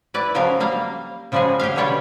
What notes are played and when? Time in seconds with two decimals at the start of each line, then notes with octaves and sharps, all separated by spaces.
0.14 E4 B4 D5
0.34 C#3 F3 F#3 A3 A#4 F5
0.60 G3 A#3 F5
1.32 C#3 F3 G3 G#3 F#4 G#4
1.59 G4 C#5 E5 F5
1.76 B2 D3 G3 C#5 D5